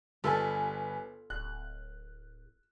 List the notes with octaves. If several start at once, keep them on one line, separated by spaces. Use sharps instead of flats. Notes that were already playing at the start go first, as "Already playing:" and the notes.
G1 F4 A4 B4 G#5
D1 F#6